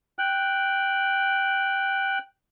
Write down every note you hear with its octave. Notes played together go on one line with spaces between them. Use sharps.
G5 F#6